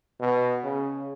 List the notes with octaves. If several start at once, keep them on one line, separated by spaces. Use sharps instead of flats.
B2
C#3